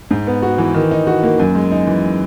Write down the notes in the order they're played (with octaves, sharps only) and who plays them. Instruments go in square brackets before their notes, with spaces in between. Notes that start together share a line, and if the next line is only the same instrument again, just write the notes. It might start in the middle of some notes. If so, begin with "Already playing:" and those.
[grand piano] G#2
B3
F#4
E3
D#3
D#4
F#4
A#3
F#2
G#3
D#4
E3